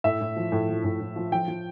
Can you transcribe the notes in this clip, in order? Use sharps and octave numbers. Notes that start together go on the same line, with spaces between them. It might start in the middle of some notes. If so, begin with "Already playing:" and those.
A2 E5
A2
F3
A2
F3
A2
A2
F3
F3 G5
F3